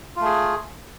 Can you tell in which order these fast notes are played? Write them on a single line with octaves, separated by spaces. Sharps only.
F4 A3 G#4